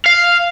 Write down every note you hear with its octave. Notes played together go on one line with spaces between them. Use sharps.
F5